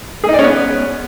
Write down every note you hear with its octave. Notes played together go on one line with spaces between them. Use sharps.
G#4
D#4
D5
C#4
B3